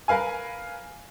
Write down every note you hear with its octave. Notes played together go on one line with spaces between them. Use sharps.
A#4 B4 F5 G#5